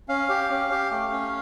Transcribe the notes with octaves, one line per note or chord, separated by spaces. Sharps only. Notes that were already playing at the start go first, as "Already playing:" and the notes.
C#4 F5
G4
C#4
G4
A3
C#4